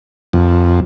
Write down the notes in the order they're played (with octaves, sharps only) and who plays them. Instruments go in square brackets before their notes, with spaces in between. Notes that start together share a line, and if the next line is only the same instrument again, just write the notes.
[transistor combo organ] F2